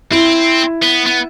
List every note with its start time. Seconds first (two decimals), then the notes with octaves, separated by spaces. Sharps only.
0.11 C4 E4
0.82 B3
1.06 B3